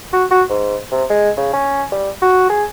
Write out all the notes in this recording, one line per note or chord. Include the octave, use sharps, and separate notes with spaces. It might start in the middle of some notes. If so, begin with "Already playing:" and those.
F#4
F#4
G#2
C3
G#3
C#3
C#4
G3
F#4
G#4